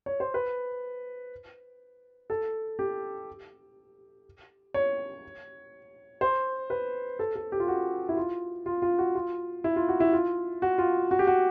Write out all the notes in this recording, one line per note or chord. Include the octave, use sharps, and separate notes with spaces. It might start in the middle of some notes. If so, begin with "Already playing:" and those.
C#5
C5
B4
A4
G4
C#5
C5
B4
A4
A4
G4
F4
F#4
E4
F4
F4
F4
F#4
F4
E4
F4
F#4
E4
F4
F#4
F4
F#4
G4
F#4